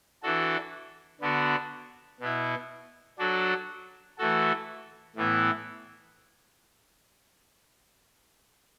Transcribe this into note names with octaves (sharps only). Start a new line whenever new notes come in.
E3 D4 F#4 A4
D3 B3 D4 F#4
B2 B3 E4
F#3 D4 F#4 A4
E3 A3 F#4 A4
A2 E3 B3 E4